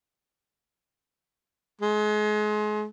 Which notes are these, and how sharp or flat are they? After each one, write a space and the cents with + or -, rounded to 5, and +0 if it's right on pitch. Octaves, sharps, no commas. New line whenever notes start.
G#3 +30